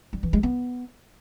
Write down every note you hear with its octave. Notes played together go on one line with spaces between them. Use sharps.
G3
E3
G#3
B3